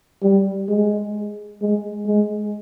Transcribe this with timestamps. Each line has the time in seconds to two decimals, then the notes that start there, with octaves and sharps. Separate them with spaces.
0.23 G3
0.69 G#3
1.61 G#3
2.07 G#3